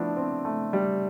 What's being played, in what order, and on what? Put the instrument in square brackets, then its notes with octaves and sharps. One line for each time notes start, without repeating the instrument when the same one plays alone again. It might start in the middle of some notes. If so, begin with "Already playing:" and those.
Already playing: [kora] F3 B3 E4 [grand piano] A3 D4
[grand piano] C4
A3
G3